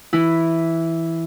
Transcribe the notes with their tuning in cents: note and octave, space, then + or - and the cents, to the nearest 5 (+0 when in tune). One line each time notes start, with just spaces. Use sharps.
E3 +0 E4 +0